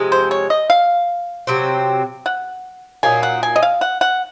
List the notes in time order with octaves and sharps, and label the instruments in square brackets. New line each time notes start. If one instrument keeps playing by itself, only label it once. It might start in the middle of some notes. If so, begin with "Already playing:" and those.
Already playing: [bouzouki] C3 F3 G#3
[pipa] C5
C#5
D#5
F5
[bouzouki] C3 F#3 C4
[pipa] F#5
[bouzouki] A#2 F#3 A#3 D#4 [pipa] G#5
[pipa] F#5
G#5
D#5
F5
F#5
F#5